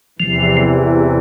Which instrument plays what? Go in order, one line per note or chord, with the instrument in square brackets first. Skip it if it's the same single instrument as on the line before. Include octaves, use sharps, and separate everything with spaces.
[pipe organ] E2 C3 E3 [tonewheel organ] F3